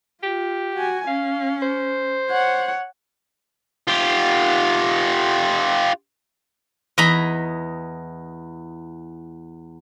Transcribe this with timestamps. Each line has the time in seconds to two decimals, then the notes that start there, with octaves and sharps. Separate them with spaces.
0.23 F4 G4
0.75 F#4 G#5
1.07 C#4 F5
1.62 C5
2.30 C#5 F#5
3.88 F4 G4
6.98 E2 D#5 G#5 A#5 B5